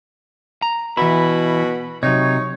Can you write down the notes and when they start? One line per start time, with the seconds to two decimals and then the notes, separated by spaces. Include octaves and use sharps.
0.62 A#5
0.97 B2 E3 E4 B5
2.03 C3 F#3 D#4 C#5